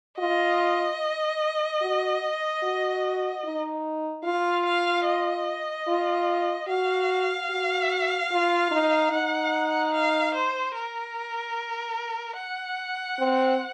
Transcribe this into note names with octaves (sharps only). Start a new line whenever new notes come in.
F4 D#5
F#4
F#4
D#4
F4 F5
F5
D#5
F4
F#4 F5
F#4
F4
D#4
D#4 F#5
F5
C5
A#4
F#5
C4